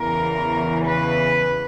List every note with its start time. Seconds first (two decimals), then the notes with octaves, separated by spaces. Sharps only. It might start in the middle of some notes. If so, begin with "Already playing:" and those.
Already playing: E2 C#3 E3 A#4
0.87 B4